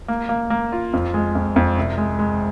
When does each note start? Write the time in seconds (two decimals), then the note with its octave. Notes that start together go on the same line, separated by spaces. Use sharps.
0.08 A#3
0.29 A#3
0.50 A#3
0.72 F4
0.93 F2
1.14 G#3
1.35 F2
1.56 F2
1.78 C2
1.98 G#3
2.19 G#3